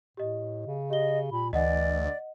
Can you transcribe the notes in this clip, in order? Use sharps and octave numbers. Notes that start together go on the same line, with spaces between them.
A2 G4 D#5
C#3
G4 D#5 G7
A#2 B5
D2 E3 D5 D#5 F#5